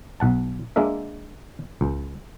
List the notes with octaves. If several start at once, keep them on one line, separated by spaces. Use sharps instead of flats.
B1 F#5 A5
G#3 A#3 D4 A#4 E5
C#2